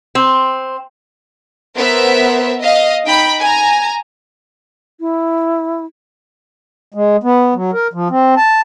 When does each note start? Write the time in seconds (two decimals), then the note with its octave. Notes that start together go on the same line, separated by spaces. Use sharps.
0.15 C4
1.76 B3 A#4 C5 E5
2.61 D#5 F5
3.05 D#4 G5 B5
3.41 G#5 A#5
5.00 E4
6.94 G#3
7.23 B3
7.55 F#3
7.73 A#4
7.93 F3
8.10 C4
8.37 A5